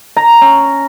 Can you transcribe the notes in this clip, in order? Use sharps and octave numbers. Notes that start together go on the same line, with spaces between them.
A#5
C#4